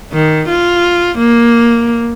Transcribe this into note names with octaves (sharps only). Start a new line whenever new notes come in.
D#3
F4
A#3